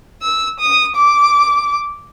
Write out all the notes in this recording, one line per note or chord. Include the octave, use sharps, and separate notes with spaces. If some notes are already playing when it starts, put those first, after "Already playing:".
E6
D#6
D6